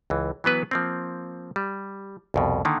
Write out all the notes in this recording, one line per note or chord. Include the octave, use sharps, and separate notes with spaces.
C#2 E3
E3 F#3 B3 B4
F3 A#3 C4
G3
C2 F2 B2
D3 D#3 A#3